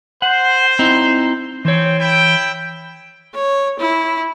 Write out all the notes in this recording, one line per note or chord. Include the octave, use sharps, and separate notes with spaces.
C5 F#5
C4 D#4 E4
E3 C4 C5 C#5 G5
E4 G5
C#5
E4